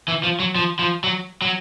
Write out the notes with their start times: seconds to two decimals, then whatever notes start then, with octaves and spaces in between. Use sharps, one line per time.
0.08 E3
0.23 F3
0.40 F#3
0.55 F3
0.79 F3
1.04 F#3
1.42 F#3